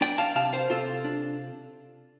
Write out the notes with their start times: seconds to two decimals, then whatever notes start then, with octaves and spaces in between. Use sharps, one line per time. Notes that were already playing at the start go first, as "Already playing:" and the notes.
0.01 D4 D5 G5
0.18 F5 A5
0.35 C3 F5 A5
0.53 C5 F5
0.70 C3 F4 A4
1.04 D4